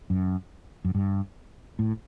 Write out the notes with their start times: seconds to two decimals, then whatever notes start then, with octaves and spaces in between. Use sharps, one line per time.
0.10 F#2
0.85 F#2
0.95 G2
1.79 A2